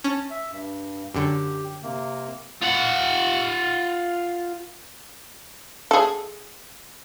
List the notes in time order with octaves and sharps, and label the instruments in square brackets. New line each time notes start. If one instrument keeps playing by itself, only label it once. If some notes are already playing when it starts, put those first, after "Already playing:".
[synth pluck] C#4 [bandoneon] A5
[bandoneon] E5
G2
[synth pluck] F#2 D3 [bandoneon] G4
[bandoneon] C3 A#3
[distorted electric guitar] F4 F#5
[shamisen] G#4 A4